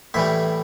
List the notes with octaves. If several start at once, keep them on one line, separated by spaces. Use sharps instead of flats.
A2 E3 G3 E5